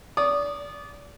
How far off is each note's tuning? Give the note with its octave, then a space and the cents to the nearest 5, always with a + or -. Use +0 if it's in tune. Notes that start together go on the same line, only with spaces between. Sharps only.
D5 -30 D#6 -20